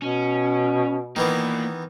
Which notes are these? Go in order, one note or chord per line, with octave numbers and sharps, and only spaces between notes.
B2 C#4
A#2 D#3 E3 A#3 B3